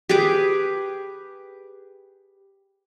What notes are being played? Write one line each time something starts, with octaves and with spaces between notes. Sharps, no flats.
G4 G#4 B4 D6